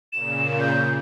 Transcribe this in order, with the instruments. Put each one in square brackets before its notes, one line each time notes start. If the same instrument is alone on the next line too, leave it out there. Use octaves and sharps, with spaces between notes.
[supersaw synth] A#2 C#3 [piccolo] E7
[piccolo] G6